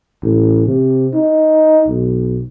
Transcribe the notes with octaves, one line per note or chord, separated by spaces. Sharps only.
A1
C3
D#4
B1